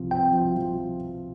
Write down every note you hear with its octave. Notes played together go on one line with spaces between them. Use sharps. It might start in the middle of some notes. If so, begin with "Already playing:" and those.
Already playing: C2 F3 C4
C4 G5
F3
F3